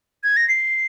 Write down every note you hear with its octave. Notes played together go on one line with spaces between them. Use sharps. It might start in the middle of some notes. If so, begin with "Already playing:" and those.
G#6
A#6
C7